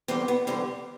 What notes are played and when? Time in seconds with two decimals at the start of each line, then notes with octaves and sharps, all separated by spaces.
0.08 E2 D3 G3 C4
0.28 B3
0.47 E2 D3 G3 C4